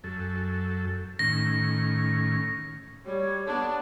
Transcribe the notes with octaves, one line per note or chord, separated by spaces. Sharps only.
F#2 A4
A2 D#3 C#4 A#6
G3 C#5
B3 D4 A5